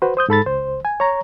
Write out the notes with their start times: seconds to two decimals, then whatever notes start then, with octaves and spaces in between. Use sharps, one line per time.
0.02 F#4 B4 C5
0.17 C5 D#6 G6
0.29 G#2 A4 B5 A6
0.46 C#2 C5
0.85 G#5
1.00 C#5 A#5